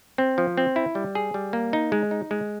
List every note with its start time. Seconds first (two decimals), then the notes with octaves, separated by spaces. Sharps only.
0.18 C4
0.38 F3
0.57 C4
0.76 E4
0.95 G3
1.15 G#4
1.34 G3
1.53 A#3
1.73 D#4
1.92 G#3
2.11 D#4
2.31 G#3